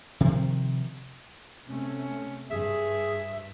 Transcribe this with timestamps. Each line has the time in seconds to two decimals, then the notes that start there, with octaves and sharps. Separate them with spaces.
0.20 C3 D#3 F3
1.67 C3 A3 C#4
2.50 G2 G#4 E5